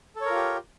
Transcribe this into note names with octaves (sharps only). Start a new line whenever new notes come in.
F4 G4 A4 A#4 C#5